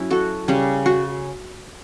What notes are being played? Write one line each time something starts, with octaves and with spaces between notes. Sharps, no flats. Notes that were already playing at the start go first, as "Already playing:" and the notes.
Already playing: F#3 C#4 E4
F#4 A4
C#3 G3 C#4
F#4